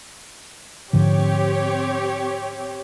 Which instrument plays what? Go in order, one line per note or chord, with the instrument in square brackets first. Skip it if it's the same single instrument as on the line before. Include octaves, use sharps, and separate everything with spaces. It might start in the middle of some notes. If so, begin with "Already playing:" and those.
[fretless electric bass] G#2 D3 F3 [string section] C4 G4 C#5